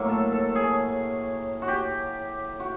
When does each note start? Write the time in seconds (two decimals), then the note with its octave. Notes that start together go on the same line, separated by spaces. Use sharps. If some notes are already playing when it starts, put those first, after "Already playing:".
Already playing: A2 F#3 A#3
0.09 A4
0.32 A4
0.55 G#4
1.62 F#4
1.68 G4
2.60 F#4